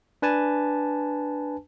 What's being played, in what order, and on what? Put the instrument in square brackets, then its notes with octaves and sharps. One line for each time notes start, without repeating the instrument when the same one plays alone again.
[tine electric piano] D4 B4 G#5 A5